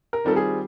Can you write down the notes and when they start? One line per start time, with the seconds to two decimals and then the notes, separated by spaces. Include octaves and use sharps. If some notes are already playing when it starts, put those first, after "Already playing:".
0.13 A#4
0.24 D#3 G3 C4 F4 A4
0.36 G#4